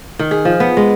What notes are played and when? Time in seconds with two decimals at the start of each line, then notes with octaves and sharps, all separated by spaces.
0.19 D#3
0.31 G#4
0.45 F3
0.60 B3
0.77 G#3